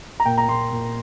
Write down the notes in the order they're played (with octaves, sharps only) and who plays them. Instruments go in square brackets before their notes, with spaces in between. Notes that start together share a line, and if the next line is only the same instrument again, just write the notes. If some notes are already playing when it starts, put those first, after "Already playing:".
[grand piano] A#5
A#2 G5
A#5
A#2 C6
A#2